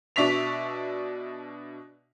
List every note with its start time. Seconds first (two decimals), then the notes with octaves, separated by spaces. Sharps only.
0.16 B2 D4 E5 C#6 B6 F7